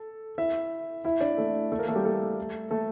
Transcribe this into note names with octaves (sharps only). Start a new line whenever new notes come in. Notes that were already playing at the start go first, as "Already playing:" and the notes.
Already playing: A4
E4 E5
E4 E5
D4 D5
A3 A4
A3 A4
A#3 A#4
A3 A4
G3 G4
A3 A4
A3 A4